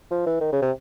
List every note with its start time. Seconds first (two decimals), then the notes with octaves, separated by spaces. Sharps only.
0.11 F3
0.26 E3
0.41 D#3
0.52 C#3
0.62 C3